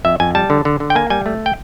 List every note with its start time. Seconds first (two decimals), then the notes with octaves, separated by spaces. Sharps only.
0.05 F2 E5
0.20 F2 G#5
0.35 G3 A5
0.50 D3
0.65 D3
0.80 D3
0.90 G5
0.95 A#3 G#5
1.10 G3 G#5
1.26 A3
1.46 G5